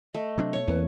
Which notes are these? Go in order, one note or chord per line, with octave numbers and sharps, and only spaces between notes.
A3 D#5
C3 F#3 C4 D4
B2 C#5 C#6 C#7
E2 E3 A#3 C4 B4